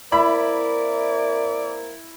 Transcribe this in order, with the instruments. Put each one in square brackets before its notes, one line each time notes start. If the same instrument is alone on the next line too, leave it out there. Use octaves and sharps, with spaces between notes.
[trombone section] A#3 C4 A#4 [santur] E4 [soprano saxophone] D5 [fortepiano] B5